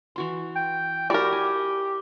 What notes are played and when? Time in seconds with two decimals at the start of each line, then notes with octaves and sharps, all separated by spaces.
0.16 E3 F#4 C6
0.56 G5
1.10 E4 F#4 G4 A#4 D5 E5
1.32 G#5